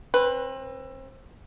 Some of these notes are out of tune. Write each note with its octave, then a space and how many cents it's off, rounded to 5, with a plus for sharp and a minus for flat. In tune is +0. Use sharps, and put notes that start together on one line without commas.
C4 +30 B4 +0